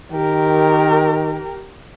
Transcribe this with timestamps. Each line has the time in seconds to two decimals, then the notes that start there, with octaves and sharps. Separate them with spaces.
0.12 D#3 G4 A#4